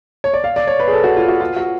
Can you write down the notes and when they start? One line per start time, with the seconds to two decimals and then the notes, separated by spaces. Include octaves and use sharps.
0.24 C#5
0.34 D5
0.44 F5
0.56 D5
0.67 C#5
0.79 B4
0.88 G#4
0.92 A4
1.04 F#4
1.16 F4
1.28 F#4
1.40 F4
1.56 F#4